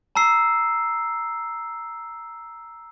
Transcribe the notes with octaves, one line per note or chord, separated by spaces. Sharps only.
A5 A#5 E6 C7